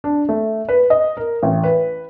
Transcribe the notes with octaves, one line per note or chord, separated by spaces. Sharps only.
D4
A3
B4
D#5
A#4
A1
B4